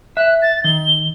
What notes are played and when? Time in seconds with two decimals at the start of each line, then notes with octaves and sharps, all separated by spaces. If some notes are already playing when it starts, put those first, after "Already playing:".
0.17 E5 F#6
0.42 A6
0.64 D#3 G7